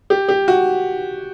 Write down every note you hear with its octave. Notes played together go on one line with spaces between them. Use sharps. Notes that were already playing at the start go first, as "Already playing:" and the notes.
G4
G4
F#4